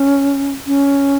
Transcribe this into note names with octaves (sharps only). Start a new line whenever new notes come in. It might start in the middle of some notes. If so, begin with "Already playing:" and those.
Already playing: C#4
C#4